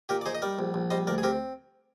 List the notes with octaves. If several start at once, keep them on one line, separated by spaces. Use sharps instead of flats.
A#2 G4 A#4
D5
D#4 G#4 C5
D#5
G3 A#4 D5
A#1
A#1
G3 C5 D#5
D2 A#4 D5
G#4
C4 G4 A#4